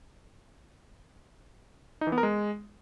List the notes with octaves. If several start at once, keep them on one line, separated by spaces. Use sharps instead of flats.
D#4
E3
B3
A#4
G#3